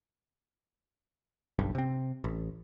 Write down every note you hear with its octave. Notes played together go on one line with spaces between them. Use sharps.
F#1 B1 G2
C3 C4
A1